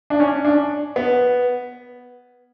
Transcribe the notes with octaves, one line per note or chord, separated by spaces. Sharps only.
D4
C#4
D4
B3